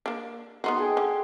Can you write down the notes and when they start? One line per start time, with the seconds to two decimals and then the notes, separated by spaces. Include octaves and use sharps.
0.06 A#3 D4
0.64 B3 D#4 F#4 C6
0.77 G#4 A4 G5
0.97 D3